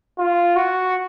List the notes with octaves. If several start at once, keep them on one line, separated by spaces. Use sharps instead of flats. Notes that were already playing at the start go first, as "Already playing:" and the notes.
F4
F#4